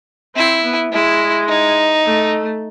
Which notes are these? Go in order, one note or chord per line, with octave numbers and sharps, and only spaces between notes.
C4 E4
B3
G#3 E4
D#4
A3